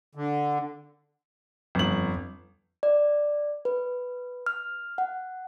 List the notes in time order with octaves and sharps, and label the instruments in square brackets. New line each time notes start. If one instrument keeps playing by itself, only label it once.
[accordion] D3
[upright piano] G1 F#7 [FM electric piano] F2
[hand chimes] D5
B4
F6
F#5